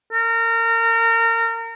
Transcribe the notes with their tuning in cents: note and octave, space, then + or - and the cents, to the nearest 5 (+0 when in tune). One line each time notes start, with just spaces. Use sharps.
A#4 -30